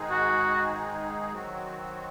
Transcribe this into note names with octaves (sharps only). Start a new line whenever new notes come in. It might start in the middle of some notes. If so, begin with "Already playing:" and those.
Already playing: G#2 D#3 G#3 D#4 G#4
F#4
D#3 F#3 C4 F#4